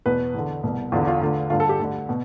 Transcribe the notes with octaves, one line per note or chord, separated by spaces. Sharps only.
E2 B2 B4
E2 D3
C2 B2
E2 D3 F4
F4
D2 D3 F4
G2 D3 F4
A4
G4
D2 D3
B2